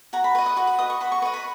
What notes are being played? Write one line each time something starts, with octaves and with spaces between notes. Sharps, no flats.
F#4 A#5
B5
B4 D#5 C#6
D#6
F#4 C#6
B5
B4 D#5 D#6
C#6
F#4 B5
C#6
B4 D#5 C#6
B5